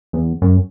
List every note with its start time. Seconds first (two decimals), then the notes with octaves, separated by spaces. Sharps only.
0.13 E2
0.42 F#2